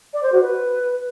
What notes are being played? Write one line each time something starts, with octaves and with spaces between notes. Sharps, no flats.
D5
C5
F#4
B4